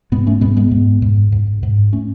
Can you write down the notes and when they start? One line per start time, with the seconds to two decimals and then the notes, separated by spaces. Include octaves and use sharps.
0.12 G#2 G#3 B3
0.27 A3 C#4
0.41 G#2 G#3 B3
0.57 G#3 B3
0.71 G#2
1.02 G#2
1.32 G#2
1.63 G#2
1.92 A3 C#4